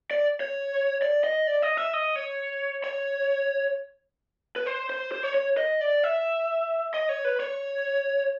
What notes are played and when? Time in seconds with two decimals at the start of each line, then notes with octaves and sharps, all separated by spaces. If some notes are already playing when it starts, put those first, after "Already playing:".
0.11 D5
0.40 C#5
1.02 D5
1.24 D#5
1.47 D5
1.62 D#5
1.77 E5
1.93 D#5
2.16 C#5
2.84 C#5
4.56 B4
4.66 C5
4.90 C5
5.12 C5
5.23 C#5
5.34 C#5
5.57 D#5
5.81 D5
6.04 E5
6.94 D#5
7.09 C#5
7.25 B4
7.40 C#5